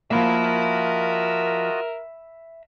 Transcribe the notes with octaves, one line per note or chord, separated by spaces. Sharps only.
F3 A#3 F4 F#4 A#4 D#5 E5 B5